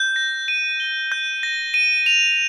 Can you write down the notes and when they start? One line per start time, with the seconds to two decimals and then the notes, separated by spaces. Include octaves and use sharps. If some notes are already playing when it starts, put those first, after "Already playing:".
Already playing: G6
0.16 A#6
0.48 D#7
0.80 G7
1.12 G6
1.43 A#6
1.74 D#7
2.06 F7